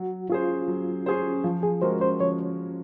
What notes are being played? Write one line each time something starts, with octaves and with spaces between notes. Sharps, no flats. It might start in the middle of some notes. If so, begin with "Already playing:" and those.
Already playing: F#3 F#4
C#4 F4 G#4 C5
F#3
C#4 G#4 C5
F3 F4
G#4
G#3 C#4 F#4 A#4 C5
C5
F3 C#5